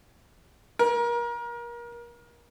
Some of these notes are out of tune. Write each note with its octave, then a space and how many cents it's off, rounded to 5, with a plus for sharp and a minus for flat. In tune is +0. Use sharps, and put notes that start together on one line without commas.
A#4 +30